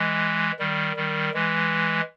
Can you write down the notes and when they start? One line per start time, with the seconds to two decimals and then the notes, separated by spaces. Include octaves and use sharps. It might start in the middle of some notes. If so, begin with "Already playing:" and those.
Already playing: E3 G#3
0.59 D#3 G3
0.96 D#3 G3
1.34 E3 G#3